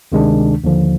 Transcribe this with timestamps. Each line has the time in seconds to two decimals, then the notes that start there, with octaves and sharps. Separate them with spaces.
0.12 D2 C3 D#3 G#3 D4
0.64 D#2 D3 F3